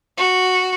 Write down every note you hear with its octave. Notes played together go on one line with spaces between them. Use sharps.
F#4